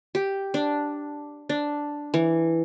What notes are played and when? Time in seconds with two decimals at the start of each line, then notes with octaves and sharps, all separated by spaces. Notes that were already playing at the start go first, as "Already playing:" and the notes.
0.15 G4
0.54 D4
1.49 D4
2.14 E3